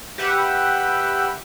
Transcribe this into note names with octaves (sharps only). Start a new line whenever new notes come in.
G4 B4 E5 F#5